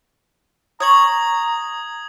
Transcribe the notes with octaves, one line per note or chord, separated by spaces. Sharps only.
C#5 A#5 C#6 D#6 G#6 F#7